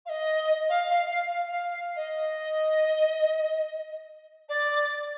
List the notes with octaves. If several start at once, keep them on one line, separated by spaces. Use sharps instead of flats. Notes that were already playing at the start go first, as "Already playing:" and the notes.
F5
D#5
F5
F5
F5
F5
F5
D#5
D5